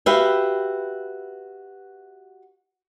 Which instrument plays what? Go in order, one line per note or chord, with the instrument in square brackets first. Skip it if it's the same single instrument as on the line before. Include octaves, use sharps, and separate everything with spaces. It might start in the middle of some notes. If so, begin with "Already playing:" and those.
[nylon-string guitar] F#4 G4 B4 E5 F5 G5